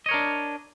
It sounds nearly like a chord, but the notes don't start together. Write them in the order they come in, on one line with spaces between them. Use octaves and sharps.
D#5 C#5 A#4 D4